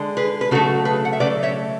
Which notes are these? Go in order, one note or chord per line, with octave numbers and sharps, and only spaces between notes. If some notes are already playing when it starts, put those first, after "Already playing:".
Already playing: D3 G#3
G#4 B4
B4
C#3 F#3 A3 F#4 A4
G#4 B4
F#5
E5
C#3 F#3 A3 B4 D5
C#5 E5